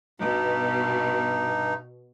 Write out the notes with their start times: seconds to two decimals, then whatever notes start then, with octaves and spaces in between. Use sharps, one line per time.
0.20 G2 B2 D#4